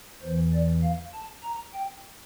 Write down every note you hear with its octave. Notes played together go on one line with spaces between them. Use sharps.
E2 E3 C5
D5
F5
A5
A#5
G5